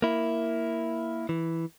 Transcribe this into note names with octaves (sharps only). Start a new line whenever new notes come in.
A#3 E4
E3